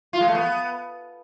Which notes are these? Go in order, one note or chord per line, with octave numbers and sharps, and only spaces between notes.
F4
G#3
A3
B3